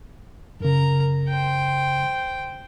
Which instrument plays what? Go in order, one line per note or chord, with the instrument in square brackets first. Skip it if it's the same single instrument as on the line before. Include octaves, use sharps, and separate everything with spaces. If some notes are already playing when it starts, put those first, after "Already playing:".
[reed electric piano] F#2 C#3 [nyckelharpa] A#4 A#5
[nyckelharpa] C5 G5